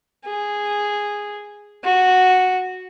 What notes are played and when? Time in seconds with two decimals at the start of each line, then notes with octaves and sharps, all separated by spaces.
0.25 G#4
1.84 F#4